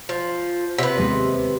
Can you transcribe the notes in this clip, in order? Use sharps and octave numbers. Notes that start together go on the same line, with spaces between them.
F3
C3 B4
D#2 G#3 B3